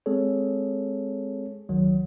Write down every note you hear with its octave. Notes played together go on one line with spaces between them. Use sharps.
G#3 C4 G#4 A4 C#5
G1 C#2 D#3 F#3